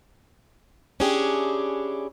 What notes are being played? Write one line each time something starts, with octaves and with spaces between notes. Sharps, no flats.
C#4 D4 E4 G4 G#4